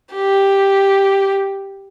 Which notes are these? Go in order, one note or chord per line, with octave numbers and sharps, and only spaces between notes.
G4